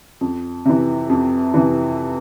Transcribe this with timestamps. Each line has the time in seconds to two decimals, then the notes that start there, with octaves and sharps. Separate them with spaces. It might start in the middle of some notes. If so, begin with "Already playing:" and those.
0.21 F2
0.65 C3 E3
1.09 F2
1.54 C3 E3